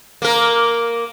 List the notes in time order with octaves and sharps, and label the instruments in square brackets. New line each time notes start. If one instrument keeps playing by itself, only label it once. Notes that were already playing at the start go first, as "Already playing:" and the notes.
[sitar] A#3 A#4